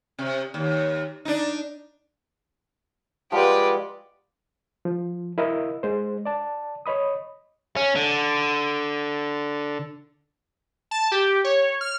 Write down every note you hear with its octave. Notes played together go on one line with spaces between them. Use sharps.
C3
D#2
D4 D#4
F3 G3 G#3 G4 B4 D5 F#5
F3
E4 A#4 D#5 F5 E6
G#3 C5
D5 A5
C#5 D#5 B5 D#6
C#4
D3
A5
G4
C#5
F6